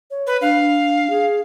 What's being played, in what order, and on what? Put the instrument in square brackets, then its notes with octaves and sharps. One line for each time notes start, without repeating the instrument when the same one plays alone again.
[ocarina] C#5
[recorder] B4
[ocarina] D4 [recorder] F5
[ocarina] G#4